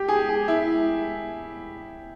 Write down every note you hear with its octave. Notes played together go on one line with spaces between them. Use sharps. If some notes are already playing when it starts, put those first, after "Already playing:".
Already playing: G4
G#4
G#4
E4